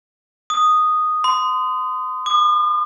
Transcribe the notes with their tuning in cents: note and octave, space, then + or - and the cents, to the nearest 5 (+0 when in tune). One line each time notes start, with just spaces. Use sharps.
D#6 -5
C6 -30
D#6 -45